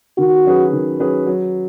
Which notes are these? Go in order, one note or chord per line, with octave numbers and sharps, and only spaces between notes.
D#3 F#4
F#3 C#4 G#4 B4
D#3
F#3 C#4 G#4 B4
F#3